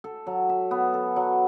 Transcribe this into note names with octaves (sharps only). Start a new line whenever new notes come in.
A4
F#3
E5
B3
A4
F#3